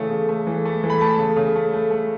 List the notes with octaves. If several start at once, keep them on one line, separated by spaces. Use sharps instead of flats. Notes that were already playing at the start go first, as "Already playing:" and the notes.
Already playing: C#3 E3 A3
C#3
A3
E3
A3
E3
B5
A3 A5
C#3
C#3
A3
A3
A3